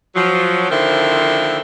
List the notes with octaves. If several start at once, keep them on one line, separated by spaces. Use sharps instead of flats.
F3 F#3
D3 D#3 F3 A#3 C4 E4